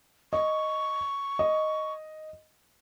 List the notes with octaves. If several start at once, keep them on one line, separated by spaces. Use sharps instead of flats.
D#5 C#6
D#5